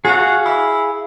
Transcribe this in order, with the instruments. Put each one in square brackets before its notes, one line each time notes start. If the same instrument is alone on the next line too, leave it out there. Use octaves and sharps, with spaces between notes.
[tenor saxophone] F#4 [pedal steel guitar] G#4 F5
[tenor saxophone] E4